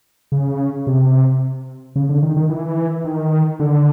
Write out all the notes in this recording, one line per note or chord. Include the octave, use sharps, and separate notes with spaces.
C#3
C3
C#3
D3
D#3
D#3
E3
D#3
D3